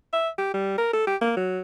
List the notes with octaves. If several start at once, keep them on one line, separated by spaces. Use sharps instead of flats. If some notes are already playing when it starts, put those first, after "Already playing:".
E5
G4
G3
A#4
A4
G4
A#3
F#3